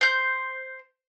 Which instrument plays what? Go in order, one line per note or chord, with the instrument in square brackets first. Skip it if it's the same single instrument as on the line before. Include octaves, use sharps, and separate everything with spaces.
[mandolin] C5 G6